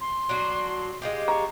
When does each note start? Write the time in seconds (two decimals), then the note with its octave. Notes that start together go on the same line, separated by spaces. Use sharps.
0.01 C6
0.29 F#3 D4 F#4
1.02 G#3 F4 G4
1.28 A#5 C#6